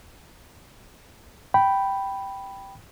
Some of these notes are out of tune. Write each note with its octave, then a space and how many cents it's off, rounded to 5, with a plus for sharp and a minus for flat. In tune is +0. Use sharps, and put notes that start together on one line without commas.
G5 -5 B5 +0